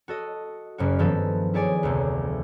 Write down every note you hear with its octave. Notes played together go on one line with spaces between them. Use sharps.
F#4 A4 D#5
F#1 F#2 F#4
G2 D#3 F3 A#3 B3 A4
E4 G#4 C#5 D5 G#5 D6
F1 D2